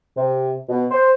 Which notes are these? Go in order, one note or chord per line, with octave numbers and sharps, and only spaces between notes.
C3
B2
C5